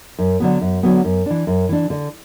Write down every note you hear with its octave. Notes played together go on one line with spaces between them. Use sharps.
F#2
D3 F#3 B3
F#2
D3 F#3 B3
F#2
E3 D4
F#2
E3 D4
D3